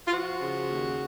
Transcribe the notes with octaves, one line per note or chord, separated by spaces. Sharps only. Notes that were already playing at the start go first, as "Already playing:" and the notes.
F4
F3 F#4
C#3
D#2